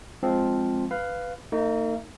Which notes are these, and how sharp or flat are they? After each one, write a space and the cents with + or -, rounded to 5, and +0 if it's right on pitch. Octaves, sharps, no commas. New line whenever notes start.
F3 +0 G#3 +0 C4 +0
B4 +10 F5 +0
A#3 -40 D#4 +5